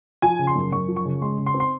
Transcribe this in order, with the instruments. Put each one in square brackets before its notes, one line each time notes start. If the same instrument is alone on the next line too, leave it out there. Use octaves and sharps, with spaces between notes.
[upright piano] F3 G#5
C#3
C6
F#2
F#2 C#6
F3
C#6
C#3
G#3 C6
C#3
C6
C4
C6